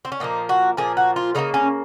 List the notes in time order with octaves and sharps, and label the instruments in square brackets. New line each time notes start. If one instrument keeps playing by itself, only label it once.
[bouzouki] C4
C#4
A#2 F3 A#3 D#4
F#4
A#2 F3 A#3 G#4
F#4
F4
C#3 F#3 A#3 D#4
C#4